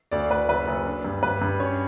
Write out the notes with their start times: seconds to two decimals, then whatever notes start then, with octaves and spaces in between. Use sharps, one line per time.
0.11 D2 D5
0.30 D2 B4
0.49 F#1 B4
0.68 F#1
0.86 D4
1.05 G2
1.23 G2 B4
1.41 G2
1.60 C#4 C#5